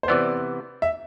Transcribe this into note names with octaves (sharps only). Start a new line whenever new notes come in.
C5
C3 E3 B3 D5
E5